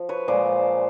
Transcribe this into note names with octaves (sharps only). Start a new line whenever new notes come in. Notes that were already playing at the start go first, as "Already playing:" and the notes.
Already playing: F3
B4 C#5
A#2 F3 G#3 C5 D5